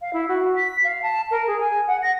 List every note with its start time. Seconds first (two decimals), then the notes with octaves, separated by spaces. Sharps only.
0.01 F5
0.13 E4
0.28 F#4
0.56 B6
0.84 F5
1.02 A5
1.31 A#4
1.47 G#4
1.60 G#5
1.87 F#5
2.02 A#6